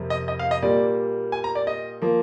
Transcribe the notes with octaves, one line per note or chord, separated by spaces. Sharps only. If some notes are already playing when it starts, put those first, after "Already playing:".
Already playing: F2 C3 G3 A#3
D#5
D#5
F5
D#5
A#2 G3 A#3 D5
G#5
A#5
D5
D#5
F3 A#3